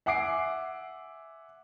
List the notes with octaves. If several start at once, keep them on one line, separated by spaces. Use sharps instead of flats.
E5 F#5 G#5 D6 C7 D7